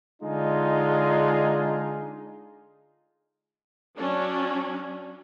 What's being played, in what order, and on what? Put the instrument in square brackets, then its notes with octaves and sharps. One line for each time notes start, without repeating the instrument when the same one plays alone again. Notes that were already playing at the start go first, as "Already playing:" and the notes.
[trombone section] D3 G#3 D4 D#4 F4 G#4
[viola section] F#3 C#4 D4